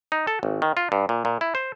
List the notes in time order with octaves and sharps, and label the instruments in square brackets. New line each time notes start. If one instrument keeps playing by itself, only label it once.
[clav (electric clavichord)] D#4
A4
G#1
D#3
F4
G2
A#2
A#2
E4
C5